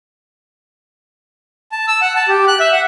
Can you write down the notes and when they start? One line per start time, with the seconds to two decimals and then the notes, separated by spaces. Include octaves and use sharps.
1.72 A5
1.88 E6
2.02 F#5
2.15 A5
2.28 G4
2.47 F#6
2.60 E5
2.72 F#5